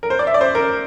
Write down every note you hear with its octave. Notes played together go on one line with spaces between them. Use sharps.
A#4
C5
D5
E5
D5
C5
A#4